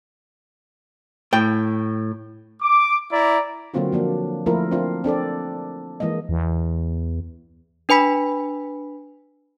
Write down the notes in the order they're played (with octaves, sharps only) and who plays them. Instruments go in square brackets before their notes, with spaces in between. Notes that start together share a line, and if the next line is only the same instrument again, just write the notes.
[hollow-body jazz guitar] A2 G5
[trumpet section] D6
E4 D5 A#5
[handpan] D3 F#3 A#3 C4 F4 F#4
F3 A#3 D4
F3 A3 A#3 E4 F4 A#4
C4 D4 E4 F4
C4 D4 A4 D5
E3 G#3 A#3 D#5
[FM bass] E2
[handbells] D4 B4 G#5 B5 B6